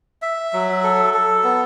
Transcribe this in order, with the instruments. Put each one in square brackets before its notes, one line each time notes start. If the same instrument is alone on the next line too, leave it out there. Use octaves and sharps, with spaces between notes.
[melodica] E5
F#3
A4
A4
B3